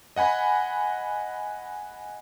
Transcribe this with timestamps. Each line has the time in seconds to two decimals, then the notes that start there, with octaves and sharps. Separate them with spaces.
0.16 D#5 F#5 G#5 B5